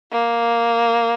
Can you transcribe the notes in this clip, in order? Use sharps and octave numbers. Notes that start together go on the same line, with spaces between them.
A#3